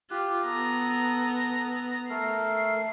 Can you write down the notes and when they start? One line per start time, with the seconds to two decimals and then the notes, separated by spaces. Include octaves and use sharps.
0.11 F4 G4 F#6
0.46 B3 A4 A#5 D#6
2.09 A3 A4 A#4 C7